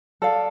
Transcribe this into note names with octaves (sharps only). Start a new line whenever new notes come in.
A4 D5 F5